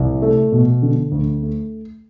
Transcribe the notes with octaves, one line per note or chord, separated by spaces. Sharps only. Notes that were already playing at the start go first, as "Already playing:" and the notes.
Already playing: C2
A3
B2
D3
D2
A3